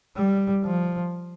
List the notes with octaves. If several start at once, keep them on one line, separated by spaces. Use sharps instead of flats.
G3
F3